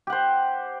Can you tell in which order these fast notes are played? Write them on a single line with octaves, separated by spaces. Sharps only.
G4 F#5 C5